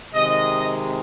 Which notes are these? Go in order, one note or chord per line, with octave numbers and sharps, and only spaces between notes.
C3 D#3 G#3 D#5